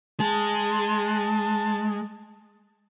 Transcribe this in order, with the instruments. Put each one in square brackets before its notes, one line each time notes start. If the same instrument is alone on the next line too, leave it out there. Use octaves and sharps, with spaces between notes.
[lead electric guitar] G#3 [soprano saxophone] A5